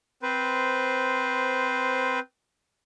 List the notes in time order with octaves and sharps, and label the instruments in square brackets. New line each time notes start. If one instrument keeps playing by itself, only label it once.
[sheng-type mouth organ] C4 B4 C5